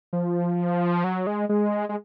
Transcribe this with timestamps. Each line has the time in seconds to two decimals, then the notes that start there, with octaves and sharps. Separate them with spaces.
0.13 F3
1.04 F#3
1.27 G#3
1.49 G#3
1.89 G#3